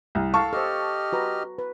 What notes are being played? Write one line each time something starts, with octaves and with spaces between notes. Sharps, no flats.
C2
A4 F5 A5 C#6
G4 A4 C5 D#5 F6
F#4 B4 A#5
B4